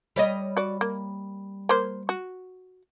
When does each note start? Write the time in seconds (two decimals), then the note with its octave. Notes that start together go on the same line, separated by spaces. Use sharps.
0.16 G3 C#5 D#5
0.57 F#4 D5
0.81 A#3
1.69 A#3 C5
2.09 F#4